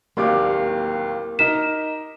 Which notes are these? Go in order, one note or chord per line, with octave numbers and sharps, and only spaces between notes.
D1 D#2 A#3 G4 D5 C6 D6
D#4 A#4 B6 E7